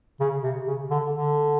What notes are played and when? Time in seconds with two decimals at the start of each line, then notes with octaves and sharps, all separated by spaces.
0.20 C#3
0.43 C3
0.67 C#3
0.90 D3
1.14 D3